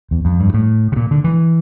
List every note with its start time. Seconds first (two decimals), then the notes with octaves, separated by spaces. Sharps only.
0.11 E2
0.25 F2
0.40 G2
0.54 A2
0.92 C#3
0.96 A#2
1.11 D3
1.24 E3